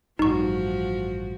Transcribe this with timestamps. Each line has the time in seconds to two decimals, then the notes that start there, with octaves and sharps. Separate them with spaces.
0.19 A1 G2 F3 D#4 F#4 C#6